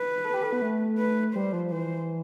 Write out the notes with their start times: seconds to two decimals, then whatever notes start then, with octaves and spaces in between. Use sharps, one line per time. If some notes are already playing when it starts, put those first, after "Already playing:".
Already playing: B4
0.24 A4
0.34 G4
0.43 A4
0.52 B3
0.62 A3
0.98 B4
1.35 G3 C5
1.53 F3
1.72 E3 C5